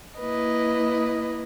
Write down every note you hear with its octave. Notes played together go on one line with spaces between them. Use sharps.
A#3 E4 B4 D#5